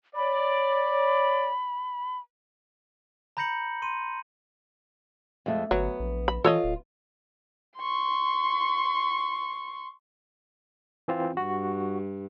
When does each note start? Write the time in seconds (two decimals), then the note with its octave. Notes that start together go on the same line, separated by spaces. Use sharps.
0.16 C#5 D5 B5
3.37 A#5 B5 G6 A#6 C#7 F#7
3.82 C6 D#7
5.46 F2 G#3 A3
5.71 G1 F#3 B3
6.00 A#1
6.28 B5
6.44 E3 F4 A4 C#5 D#5
6.64 D1
7.78 C6 C#6
11.08 E3 C4 F4
11.37 G2 F#4